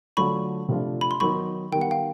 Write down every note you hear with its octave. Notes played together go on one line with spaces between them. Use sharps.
D3 F#3 A3 D4 F4 B5 C#6
C3 F3 A3 D4 F4
B5
C6
D#3 F#3 B3 D#4 B5 C#6
D#3 G3 B3 G5
F#5
F5 G5